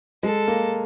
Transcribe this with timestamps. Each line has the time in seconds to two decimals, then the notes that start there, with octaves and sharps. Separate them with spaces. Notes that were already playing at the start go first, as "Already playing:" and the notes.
0.23 G#3 A4
0.48 A#3